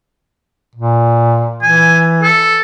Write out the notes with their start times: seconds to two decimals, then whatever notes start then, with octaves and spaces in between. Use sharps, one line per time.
0.76 A#2
1.63 E3 G#5
2.23 A4